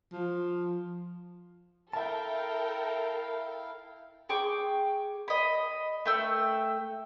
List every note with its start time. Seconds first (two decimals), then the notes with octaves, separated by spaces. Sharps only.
0.12 F3
1.93 E4 A4 A#4 E5 F5 G5 A5
4.29 G#4 G5 C#6 D6
5.28 D#5 B5
6.05 A3 G5 E6